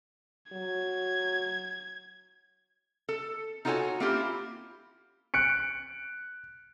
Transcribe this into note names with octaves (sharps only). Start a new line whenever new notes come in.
F#3 G#6
A4
D#4 F4 F#4 A4 C#5 G#5
A#3 C4 C#4 E4 F4 G4
F#6 C#7 D7